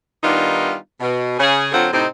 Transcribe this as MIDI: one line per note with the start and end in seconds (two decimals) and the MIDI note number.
0.23 0.75 51
0.23 0.75 55
0.23 0.75 59
0.23 0.75 62
0.23 0.75 63
0.23 0.75 65
1.01 1.35 47
1.39 1.68 49
1.39 1.68 68
1.72 1.87 50
1.72 1.87 54
1.72 1.87 60
1.72 1.87 65
1.72 1.87 69
1.72 1.87 78
1.93 2.05 45
1.93 2.05 48
1.93 2.05 60
1.93 2.05 63